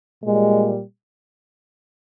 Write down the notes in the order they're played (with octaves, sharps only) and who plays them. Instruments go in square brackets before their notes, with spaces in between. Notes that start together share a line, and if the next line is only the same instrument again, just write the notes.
[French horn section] A#2 G3 G#3